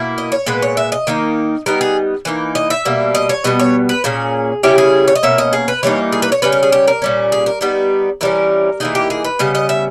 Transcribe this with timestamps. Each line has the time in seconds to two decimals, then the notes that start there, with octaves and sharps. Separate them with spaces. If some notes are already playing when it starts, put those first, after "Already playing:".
Already playing: B2 A#3 E4
0.18 D#5
0.32 C#5
0.46 A#2 G#3 B3 B4
0.62 C#5
0.77 E5
0.92 D#5
1.07 D#3 A#3 D#4
1.66 G3 B3 D#4 A#4
1.81 G#4
2.25 E3 A#3 D#4
2.55 D#5
2.70 E5
2.85 B2 G3 A#3
3.15 D#5
3.29 C#5
3.44 B2 G3 B3 D#5
3.60 C#5
3.89 B4
4.04 A#2 A#3 C#4 G#4
4.63 C#3 G3 C#4 E4 G4
4.78 G#4
5.08 C#5
5.15 D#5
5.23 B2 A#3 C#4 E5
5.38 D#5
5.53 G#4
5.68 B4
5.83 E3 G3 A#3 D#4 C#5
6.12 G#4
6.22 B4
6.32 C#5
6.42 C#3 G3 C#4 B4
6.52 A#4
6.63 G#4
6.72 G4
6.87 A#4
7.02 A#2 G3 C#4
7.32 G#4
7.46 A#4
7.61 G3 B3 D#4
8.21 E3 G3 C#4 A#4
8.80 E3 A#3 D#4 G#4
8.95 G4
9.10 G#4
9.25 B4
9.39 C#3 G3 B3 D#5
9.55 D#5
9.69 E5